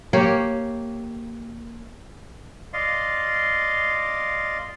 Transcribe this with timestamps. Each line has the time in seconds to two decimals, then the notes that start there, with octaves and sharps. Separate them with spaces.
0.13 A#3 G4 C#5
2.73 D5 D#5 F5 C6